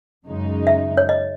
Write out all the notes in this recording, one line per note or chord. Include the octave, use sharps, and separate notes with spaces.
F#2 C#3 G#3 D#4
E5
C#5
D#5